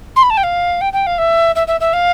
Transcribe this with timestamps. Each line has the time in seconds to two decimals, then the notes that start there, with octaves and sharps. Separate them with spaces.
0.16 C6
0.23 B5
0.30 A5
0.37 G5
0.43 F5
0.81 G5
0.93 G5
1.07 F5
1.18 E5
1.55 E5
1.67 E5
1.80 E5
1.93 F5